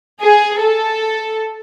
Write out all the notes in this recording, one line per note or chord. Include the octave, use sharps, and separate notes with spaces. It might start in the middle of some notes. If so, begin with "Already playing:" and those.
G#4
A4